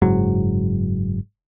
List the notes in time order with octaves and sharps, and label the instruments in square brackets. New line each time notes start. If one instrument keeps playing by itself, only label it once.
[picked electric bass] F#1 G#2 F#3